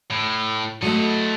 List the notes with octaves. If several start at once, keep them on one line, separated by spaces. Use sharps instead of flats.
A2
F#3 A3 A4 D#5